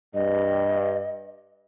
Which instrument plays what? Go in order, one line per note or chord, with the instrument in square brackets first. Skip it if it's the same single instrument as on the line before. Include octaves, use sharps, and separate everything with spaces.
[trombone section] G2 [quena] D#5